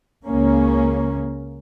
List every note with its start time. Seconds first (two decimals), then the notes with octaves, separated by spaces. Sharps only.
0.25 C#2 C#3 A#3 C#4